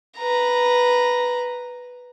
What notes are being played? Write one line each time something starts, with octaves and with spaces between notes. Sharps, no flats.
B4 A#5